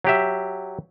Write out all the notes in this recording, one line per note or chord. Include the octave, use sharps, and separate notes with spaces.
F#3 G4 E5